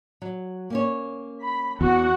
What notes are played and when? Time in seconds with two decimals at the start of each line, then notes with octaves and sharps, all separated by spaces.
0.22 F#3
0.70 A#3 C#4 C#5
1.41 B5
1.81 E2 F#4 F#5